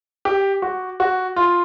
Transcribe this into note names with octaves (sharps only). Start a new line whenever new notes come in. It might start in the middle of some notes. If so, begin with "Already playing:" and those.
G4
F#4
F#4
F4